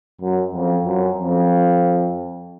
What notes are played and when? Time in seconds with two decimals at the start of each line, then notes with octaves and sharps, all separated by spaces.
0.21 F#2
0.53 F2
0.85 F#2
1.18 F2